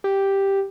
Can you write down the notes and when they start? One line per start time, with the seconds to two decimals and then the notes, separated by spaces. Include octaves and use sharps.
0.04 G4